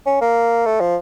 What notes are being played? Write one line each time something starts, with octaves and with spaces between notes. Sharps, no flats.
C#4
A#3
A3
F3